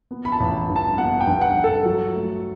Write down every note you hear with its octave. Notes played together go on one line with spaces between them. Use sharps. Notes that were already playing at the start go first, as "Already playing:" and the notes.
B3
B5
A5
A1
G2
A5
B3 F#5
G5
G2
F#5
G2
A4
F#3
A3